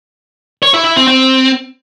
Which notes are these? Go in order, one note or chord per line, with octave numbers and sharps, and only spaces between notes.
C#5
E4
E4
C4
C4